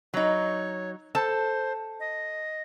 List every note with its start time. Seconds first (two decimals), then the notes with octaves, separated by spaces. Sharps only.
0.14 F#3 D#4 C#5
1.15 A4 C5 A5
2.00 D#5